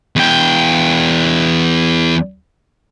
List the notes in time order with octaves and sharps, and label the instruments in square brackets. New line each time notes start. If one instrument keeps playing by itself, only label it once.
[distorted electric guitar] E2 G5